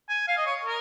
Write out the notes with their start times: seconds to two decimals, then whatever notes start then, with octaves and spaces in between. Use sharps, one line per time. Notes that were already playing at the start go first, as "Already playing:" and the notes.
0.09 G#5
0.28 F5
0.37 D#5
0.46 C#5
0.65 A#4